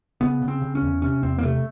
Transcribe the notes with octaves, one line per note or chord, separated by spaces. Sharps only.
C#3 B3
C#3
C4
C#3
C#4
E2
C3 C#4
E2 C4
A#3
C3 A3